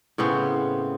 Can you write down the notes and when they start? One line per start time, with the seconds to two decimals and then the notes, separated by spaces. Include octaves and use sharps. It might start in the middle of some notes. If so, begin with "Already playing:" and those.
0.18 A2 C#3 B3 C4